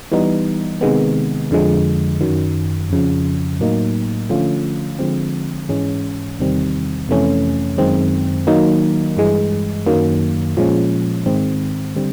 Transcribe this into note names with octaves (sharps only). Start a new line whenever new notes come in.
E3 G3 B3 D#4
C3 D#3 G#3 B3
F2 D3 F3 G#3
F#2 D#3 F#3
F2 C#3 F3
A2 F#3 A#3 D#4
D3 F3 A3 C#4 F4
D3 F3 G#3 C4
G#2 E3 G#3 C#4
E2 C3 D#3 G3 C4
F2 C3 E3 A3 C#4
F#2 D#3 G#3 C4
D#3 F#3 A#3 D#4
G2 E3 G#3
F#2 D#3 F#3 A#3
A#2 F3 G#3 C#4
G#2 D#3 G#3 C4
D3 G3 C4